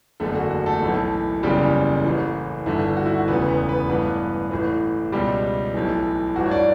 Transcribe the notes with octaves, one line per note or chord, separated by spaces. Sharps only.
F#1 E2 D3 A3 A4
F#4
F#4
A3 A4
B1 A2 E3
F#1 E2 C#3 E3 G3 G4
A1 A2 E3
G1 G2 D3 E4
F#4
E4
F#4
E1 D2 C#3 E3 B3 B4
B3 B4
B3 B4
A1 G2 E3 B3 B4
A1 A2 E3
C#2 B2 G3 G4
B1 A2 E3
A1 G2 E3 F#4
C#5
D4 D5